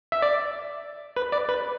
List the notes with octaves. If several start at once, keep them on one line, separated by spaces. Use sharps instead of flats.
E5
D5
B4
D5
B4